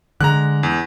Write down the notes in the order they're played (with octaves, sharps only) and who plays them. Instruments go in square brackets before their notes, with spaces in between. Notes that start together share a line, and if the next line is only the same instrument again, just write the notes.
[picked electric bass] D3 G#3 [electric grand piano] A#5 F#6
[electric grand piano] E2